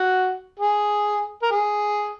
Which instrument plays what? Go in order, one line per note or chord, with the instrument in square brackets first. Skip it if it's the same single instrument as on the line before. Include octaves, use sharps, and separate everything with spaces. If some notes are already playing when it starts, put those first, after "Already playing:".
Already playing: [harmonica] F#4
G#4
A#4
G#4